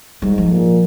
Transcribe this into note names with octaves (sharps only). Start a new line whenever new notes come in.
G#2 G3
F3
A#2